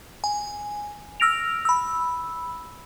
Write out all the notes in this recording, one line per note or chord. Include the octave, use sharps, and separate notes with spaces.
G#5
E6 F6 A#6 D7 F7
B5 E6